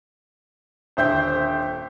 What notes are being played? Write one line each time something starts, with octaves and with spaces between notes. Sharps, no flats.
D#1 D3 C5 E5 G5 G6